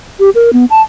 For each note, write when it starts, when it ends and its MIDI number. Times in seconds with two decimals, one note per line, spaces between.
0.20 0.30 67
0.35 0.53 70
0.53 0.65 59
0.70 0.82 81